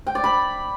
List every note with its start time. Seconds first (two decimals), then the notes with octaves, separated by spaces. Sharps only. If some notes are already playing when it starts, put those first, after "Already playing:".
0.07 G5
0.15 D5
0.24 B5